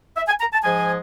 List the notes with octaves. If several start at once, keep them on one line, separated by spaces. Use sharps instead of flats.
E5
G#5
A#5
A5
G#2 F3 G#3 G#5